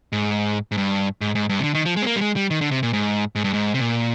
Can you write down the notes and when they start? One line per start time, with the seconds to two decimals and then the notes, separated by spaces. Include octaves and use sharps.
0.12 G#2
0.72 G#2
0.77 G2
1.21 G#2
1.35 G#2
1.49 G2
1.59 C3
1.64 D3
1.75 D#3
1.86 F3
1.96 G#3
2.02 C4
2.06 A#3
2.16 G3
2.21 G#3
2.36 G3
2.50 D#3
2.61 D3
2.71 C3
2.83 A#2
2.93 G#2
3.35 G#2
3.44 G2
3.53 G#2
3.74 C3
3.80 A#2